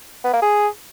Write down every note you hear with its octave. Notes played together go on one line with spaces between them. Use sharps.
B3
A#3
G#4